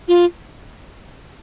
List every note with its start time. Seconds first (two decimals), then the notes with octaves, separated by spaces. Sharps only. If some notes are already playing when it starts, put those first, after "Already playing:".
0.08 F4